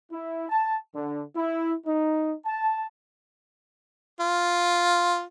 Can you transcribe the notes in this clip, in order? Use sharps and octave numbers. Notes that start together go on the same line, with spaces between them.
E4
A5
D3
E4
D#4
A5
F4